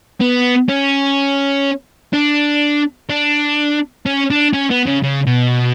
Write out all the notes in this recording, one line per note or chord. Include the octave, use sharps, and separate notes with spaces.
B3
C#4
D4
D4
C#4
D4
C#4
B3
C#3
C#3
B2